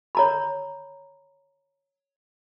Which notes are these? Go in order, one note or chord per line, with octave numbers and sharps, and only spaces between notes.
C#5 A#5 B5